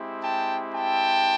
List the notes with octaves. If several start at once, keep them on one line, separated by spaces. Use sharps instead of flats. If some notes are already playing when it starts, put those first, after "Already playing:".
Already playing: G#3 C4 E4 G4
G5 A5
G5 A5